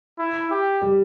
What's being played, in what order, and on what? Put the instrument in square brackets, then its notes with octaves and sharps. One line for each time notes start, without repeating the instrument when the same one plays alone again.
[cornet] E4
G4
[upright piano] G3